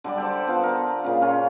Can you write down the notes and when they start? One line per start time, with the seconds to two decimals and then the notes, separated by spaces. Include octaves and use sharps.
0.04 D3 G3 D5
0.18 G4 A4 C5
0.47 B3 F4 A4
0.63 A#4
1.04 A#2 C#3
1.22 C#4 F4